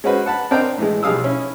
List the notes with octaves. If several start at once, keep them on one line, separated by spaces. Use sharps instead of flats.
G#3 C#4 F#4 B4 C5
F#5 A5 B5
C4 D4 A#4 D5 D#5 G5
A2 E3 G#3
B1 G3 G#4 F5 D#6 E6
C#4 E4